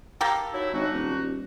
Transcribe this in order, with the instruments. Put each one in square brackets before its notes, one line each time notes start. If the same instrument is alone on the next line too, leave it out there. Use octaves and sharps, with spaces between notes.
[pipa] A#3 G4 A4
[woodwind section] F#3 D#4 E4
[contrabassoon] G#1 [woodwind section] D4 D#4 F#4
[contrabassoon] D#1